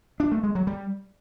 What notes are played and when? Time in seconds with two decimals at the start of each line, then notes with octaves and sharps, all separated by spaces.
0.20 D4
0.32 A3
0.43 G#3
0.55 F#3
0.67 G3